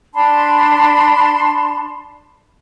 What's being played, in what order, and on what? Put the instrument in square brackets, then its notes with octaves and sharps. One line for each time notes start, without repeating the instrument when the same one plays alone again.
[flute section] D4 A5 B5 C6